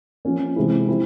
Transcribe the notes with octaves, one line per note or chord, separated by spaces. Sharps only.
F3 A#3 C#4
C3 E3 G#3 C4 E4
F3 C4 E4